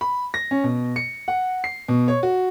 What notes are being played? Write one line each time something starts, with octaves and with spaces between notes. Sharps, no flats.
B5
A#6
C#4
B2
C#7
F#5
C7
B2
C#5
F#4